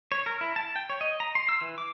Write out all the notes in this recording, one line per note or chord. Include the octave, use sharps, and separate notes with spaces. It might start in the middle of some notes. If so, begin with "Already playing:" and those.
C#5
A#4
E4
A5
G5
C#5
D#5
A#5
C6
E6
E3
D6